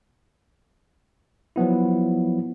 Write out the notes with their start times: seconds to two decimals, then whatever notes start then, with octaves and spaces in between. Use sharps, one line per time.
1.56 F3 F#3 B3 E4